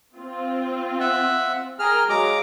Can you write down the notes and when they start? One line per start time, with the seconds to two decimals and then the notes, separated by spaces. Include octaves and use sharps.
0.15 C4 F4
1.00 E5 F#5
1.79 G#4 A#4 G5 A#5 F6
2.09 F#3 G#3 F5 A#5 D6